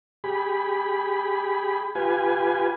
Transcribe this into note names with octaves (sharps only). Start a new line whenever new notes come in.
G4 G#4 B5
F4 G4 B4 G#5